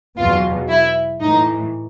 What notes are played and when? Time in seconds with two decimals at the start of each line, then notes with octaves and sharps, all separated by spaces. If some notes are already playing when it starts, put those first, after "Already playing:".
0.17 E2 B2 F#3 F4
0.69 E4
1.20 A2 E3 D#4